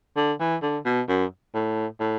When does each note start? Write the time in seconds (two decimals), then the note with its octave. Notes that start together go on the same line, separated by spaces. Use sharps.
0.17 D3
0.40 E3
0.62 D3
0.85 B2
1.09 F#2
1.55 A2
2.00 A2